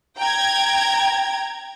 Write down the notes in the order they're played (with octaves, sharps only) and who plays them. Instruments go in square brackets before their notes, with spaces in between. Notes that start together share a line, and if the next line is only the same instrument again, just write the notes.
[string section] G5 A#5 G#6